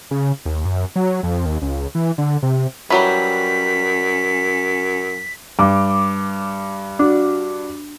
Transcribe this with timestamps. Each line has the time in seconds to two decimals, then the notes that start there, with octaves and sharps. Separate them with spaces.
0.11 C#3
0.45 D#2
0.65 F#2
0.96 F#3
1.23 F2
1.46 D#2
1.62 C#2
1.95 E3
2.18 D3
2.43 C3
2.90 F#2 E3 F#3 G3 B6
5.59 G2 D6
6.99 D4 F#4